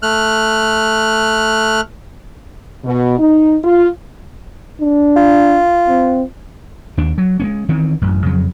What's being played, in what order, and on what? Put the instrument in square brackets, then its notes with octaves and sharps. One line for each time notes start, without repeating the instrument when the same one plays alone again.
[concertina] A3 F6 F#6
[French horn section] B2
D#4
F4
[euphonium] D4
[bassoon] F4
[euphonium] C4
[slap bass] D#2 D4
F#3
G#3 B3 C#4
D#3 E3 C4 C#4
A1 F#2
F2 C#3 F#3